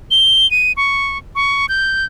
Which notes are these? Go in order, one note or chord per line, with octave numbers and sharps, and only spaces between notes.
G7
D#7
C#6
C#6
G6